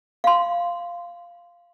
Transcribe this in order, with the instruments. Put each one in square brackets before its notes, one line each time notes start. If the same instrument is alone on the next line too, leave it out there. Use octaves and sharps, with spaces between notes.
[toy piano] F5 C6